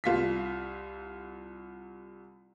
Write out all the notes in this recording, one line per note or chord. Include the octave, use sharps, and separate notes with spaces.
C2 F4 B6